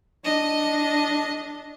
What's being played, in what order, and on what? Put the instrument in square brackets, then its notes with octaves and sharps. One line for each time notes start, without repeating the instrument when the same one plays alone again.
[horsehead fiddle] D4 [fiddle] D#5